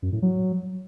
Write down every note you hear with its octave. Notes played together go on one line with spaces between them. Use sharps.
F#2
A2
F#3